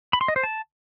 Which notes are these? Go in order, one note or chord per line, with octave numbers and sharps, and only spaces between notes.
B5
C6
D#5
C5
A5